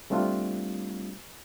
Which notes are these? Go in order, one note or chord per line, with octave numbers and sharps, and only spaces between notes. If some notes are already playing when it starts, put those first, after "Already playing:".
G3 A3 C4 D4 F4